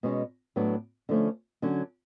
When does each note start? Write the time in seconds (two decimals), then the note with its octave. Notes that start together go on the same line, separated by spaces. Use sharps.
0.03 B2 G#3 C#4
0.56 A2 F#3 B3 D4
1.09 D3 F3 A3 C#4
1.62 D3 F#3 C#4